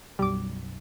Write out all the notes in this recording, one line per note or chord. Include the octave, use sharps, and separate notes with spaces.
B1 F#2 G3 D6